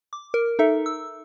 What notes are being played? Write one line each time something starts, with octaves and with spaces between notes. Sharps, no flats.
D6
A#4
D#4 A4 E5
E6